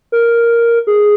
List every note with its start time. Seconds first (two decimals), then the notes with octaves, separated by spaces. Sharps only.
0.12 A#4
0.87 G#4